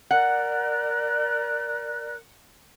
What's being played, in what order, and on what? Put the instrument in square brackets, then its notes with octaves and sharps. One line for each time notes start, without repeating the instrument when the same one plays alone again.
[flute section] A#4 D5 F#6 [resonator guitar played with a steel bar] F#5